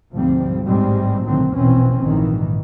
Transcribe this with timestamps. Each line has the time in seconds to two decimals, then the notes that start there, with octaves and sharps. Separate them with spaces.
0.13 D2 G#2 B2 F3 G3 C4
0.66 A1 G#2 G3 G#3 C4
1.24 B1 A2 D3 D#3 F#3 C4
1.56 A#1 E2 B2 E3 C4 C#4
2.02 A#1 G#2 D#3 E3